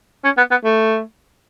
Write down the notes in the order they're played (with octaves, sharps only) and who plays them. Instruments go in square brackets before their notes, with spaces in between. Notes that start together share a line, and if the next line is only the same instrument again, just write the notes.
[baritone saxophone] C#4
B3
B3
A3